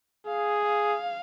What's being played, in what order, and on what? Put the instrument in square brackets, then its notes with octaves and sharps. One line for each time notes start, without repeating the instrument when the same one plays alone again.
[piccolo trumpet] G#4 [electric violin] F5
[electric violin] F5